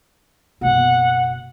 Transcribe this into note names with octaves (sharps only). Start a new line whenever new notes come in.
F#1 B2 F#5